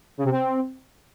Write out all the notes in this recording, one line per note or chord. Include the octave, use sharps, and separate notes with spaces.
C#3
C3
C4